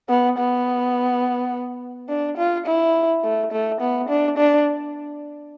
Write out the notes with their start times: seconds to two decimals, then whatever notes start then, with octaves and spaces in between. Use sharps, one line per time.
0.09 B3
0.38 B3
2.09 D4
2.37 F4
2.66 E4
3.24 A3
3.52 A3
3.81 B3
4.08 D4
4.38 D4